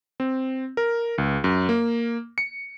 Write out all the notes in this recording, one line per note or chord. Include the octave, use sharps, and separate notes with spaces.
C4
A#4
C#2
F#2
A#3
C#7